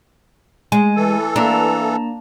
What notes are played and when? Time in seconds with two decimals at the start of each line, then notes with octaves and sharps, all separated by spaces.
0.72 G#3 G#5
0.96 E3 A4
1.36 A#3 D4 A5 A#5